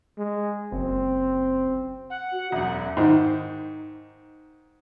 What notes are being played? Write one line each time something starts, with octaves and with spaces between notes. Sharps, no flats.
G#3
F#1 C4
F#5
F#4
E1 F#2 E5
G#2 D#3